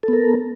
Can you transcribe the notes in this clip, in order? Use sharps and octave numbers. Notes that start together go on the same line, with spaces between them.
B3 A4 A#4